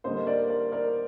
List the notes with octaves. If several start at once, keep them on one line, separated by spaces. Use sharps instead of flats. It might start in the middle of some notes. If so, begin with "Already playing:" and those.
D3 G3 A#3 C5 D#5
A#4 D5
A#4 D5
A#4 D5